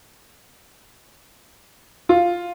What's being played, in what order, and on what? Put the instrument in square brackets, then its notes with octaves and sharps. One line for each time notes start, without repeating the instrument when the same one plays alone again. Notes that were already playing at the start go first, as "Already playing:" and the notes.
[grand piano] F4